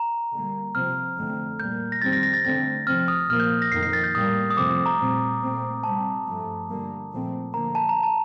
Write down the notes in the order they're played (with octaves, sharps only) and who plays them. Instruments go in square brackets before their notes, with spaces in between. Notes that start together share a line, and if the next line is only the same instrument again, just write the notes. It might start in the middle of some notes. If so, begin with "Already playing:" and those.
Already playing: [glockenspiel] A#5
[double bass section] D3 G3 A#3
[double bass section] C3 F3 C4 [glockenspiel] F6
[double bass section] F2 D3 A3 C4
[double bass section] A#2 G3 A#3 [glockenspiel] G6
[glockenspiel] A#6
[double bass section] F2 D#3 G3 C4 [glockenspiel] A6
[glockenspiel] A#6
A#6
A6
[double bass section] D3 A3 C4 [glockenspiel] A6
[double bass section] C3 F3 C4 [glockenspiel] F6
[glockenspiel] D#6
[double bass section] A#2 F3 A#3 [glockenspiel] F6
[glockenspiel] G6
A#6
[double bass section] F2 D#3 A#3 [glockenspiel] C7
[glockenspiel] C7
A6
G6
[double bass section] A2 G3 A#3 [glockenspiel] D#6
[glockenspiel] D#6
[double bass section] F2 C3 F3 A3 C4 [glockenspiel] D6
[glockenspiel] A#5
[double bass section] A#2 G3 C4
A#2 A3 C4
[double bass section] C3 G3 C4 [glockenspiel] A5
[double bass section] G2 F3 A3
D3 G3 A#3
A#2 F3 A3 C4
[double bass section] D3 F3 A#3 [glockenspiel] A#5
[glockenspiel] A5
A#5
A5